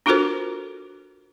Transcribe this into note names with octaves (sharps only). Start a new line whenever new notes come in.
D4 F4 F#4 A4 A#4 C5